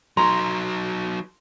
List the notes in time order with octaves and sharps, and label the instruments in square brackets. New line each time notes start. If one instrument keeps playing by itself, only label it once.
[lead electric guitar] F#3 D#4 [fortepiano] A#5 [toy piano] C6